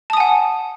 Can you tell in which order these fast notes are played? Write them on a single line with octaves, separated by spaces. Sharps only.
A5 D#6 G#5 F#5